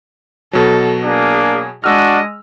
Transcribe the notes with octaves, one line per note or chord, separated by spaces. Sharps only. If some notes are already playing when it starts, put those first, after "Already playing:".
B2 F#3 A4
A#3 D4 G#4
G#3 D4 F#4 D#5 E6 F6